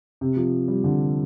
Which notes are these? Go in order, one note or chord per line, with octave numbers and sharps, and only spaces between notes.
C3
F3
G3
D3